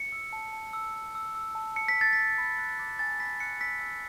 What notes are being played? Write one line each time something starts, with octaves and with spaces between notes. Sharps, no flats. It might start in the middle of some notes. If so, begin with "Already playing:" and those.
Already playing: C#7
E6
A5
A5
E6
E6
E6
E6
A5
A5 C#7
B6
E6
A6
E6 B6
B5
F#6
D6
G#5 A6
B5 B6
F#6 C#7
E6 B6
E6